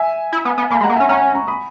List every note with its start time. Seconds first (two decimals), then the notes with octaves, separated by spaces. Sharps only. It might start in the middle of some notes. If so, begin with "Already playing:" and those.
Already playing: E5 G#5
0.32 E4
0.45 B3
0.58 B3
0.70 A#3 G#5 B5
0.80 G#3
0.83 F#5 A#5
0.89 A#3
0.96 C#4 E5 G#5
1.09 C#4 F#5 A#5
1.35 A#5 C#6
1.47 B5 D#6